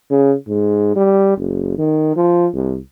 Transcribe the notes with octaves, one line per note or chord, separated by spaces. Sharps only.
C#3
G#2
G3
F#1
D#3
F3
C2